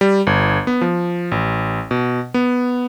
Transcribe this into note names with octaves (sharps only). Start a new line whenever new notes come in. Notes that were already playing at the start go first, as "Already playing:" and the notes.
G3
G1
B3
F3
A1
B2
B3